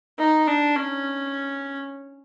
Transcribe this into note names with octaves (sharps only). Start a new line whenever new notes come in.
D#4
D4
C#4